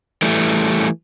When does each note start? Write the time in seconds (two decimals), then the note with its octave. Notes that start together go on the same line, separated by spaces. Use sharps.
0.22 E3 G3 A3